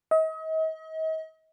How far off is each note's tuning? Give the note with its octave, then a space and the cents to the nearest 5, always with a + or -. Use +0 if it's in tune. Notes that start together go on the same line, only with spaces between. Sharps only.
D#5 +40